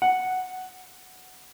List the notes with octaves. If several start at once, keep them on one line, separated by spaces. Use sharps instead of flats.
F#5